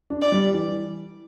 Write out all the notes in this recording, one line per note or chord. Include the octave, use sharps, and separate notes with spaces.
D4
D5
G3
E3